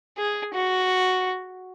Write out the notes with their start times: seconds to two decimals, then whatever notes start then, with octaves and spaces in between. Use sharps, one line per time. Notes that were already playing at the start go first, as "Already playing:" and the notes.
0.18 G#4
0.53 F#4